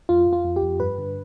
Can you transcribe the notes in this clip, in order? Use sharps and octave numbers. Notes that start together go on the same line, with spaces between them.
F2 F4
F2
F4
F2
G4
F2
G2 B4
D3